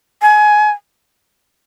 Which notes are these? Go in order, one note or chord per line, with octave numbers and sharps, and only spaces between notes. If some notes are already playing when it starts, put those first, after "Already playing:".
G#5